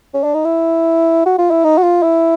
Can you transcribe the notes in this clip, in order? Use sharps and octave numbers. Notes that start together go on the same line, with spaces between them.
C#4
D4
D#4
E4
F#4
F4
E4
D#4
F#4
F4
E4